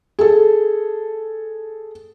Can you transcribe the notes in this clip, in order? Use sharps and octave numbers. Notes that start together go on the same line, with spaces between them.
G#4 A4